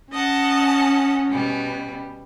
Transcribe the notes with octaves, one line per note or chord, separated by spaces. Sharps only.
C#4 D#5 F#5 A5
B2 G3